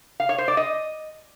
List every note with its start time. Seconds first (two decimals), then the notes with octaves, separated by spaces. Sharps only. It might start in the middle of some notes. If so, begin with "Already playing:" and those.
0.20 F5
0.29 C#5
0.38 C5
0.48 D5
0.57 D#5